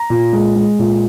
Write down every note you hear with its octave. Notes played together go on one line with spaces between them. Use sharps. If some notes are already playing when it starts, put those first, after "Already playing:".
Already playing: A#5
A#2
G#3
G#3
A#2